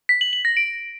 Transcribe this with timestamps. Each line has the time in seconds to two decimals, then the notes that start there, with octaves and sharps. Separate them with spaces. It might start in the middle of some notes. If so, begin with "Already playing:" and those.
0.09 B6
0.21 F#7
0.33 F#7
0.45 A#6
0.57 D7